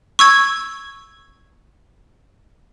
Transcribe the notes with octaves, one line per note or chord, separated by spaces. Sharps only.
C#6 E6 G#6